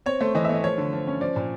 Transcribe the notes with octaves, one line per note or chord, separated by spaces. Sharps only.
C4 C#5
A3 C5
E3 D#5
E5
A3 D#5
F3 C#5
D3
F3
C#4
F3 D5
A#2